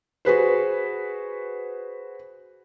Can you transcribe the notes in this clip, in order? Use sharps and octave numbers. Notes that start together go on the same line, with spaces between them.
F#4 G#4 B4 C5